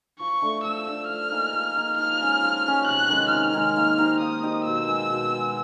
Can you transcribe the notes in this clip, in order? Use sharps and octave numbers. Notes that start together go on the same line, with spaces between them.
F3 C#6
A3 D4
F3 E6
A3 D4
F3 F6
A#3 D#4 G#4
F3
A#3 D#4 G#4
F3 F6
G#3 C#4
F3
G#3 C#4
C3 F#6
D#3 G#3 C#4
C3 F6
D#3 G#3 C#4
A#3
D#4 G4 C5
A#3 D#6
D#4 G4 C5
B2 E6
G#3 B3
B2
G#3 B3